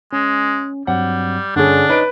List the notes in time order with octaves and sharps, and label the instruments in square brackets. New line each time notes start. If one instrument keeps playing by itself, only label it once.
[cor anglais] G#3 [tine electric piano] C#4
[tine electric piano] G2 F#3 C4 [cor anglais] G3 [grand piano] F#5
[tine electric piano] G2 [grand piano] D3 C#4 G#4 [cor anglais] D4
[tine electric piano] D#4 C#5 D#5 [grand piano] B4 D7